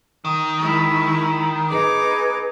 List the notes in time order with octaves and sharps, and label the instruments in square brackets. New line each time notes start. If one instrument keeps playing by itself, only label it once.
[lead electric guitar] D#3
[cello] G#3 E4
[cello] D#4 [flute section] G#4 B4 [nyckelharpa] D6